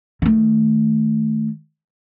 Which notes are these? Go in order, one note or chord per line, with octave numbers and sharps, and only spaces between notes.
D#3 A3